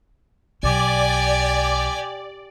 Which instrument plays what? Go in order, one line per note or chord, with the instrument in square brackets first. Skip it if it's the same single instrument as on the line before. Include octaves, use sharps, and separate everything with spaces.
[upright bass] B1 [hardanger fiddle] G4 G#5 [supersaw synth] D5